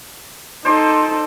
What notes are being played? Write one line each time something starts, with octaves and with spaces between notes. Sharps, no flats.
D#4 A4 C5 D5 C6